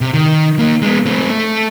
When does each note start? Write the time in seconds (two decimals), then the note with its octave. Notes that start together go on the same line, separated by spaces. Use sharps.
0.01 C3
0.14 D#3
0.59 A#3 D#4
0.82 G#3 B3
1.06 A3 C4
1.30 A3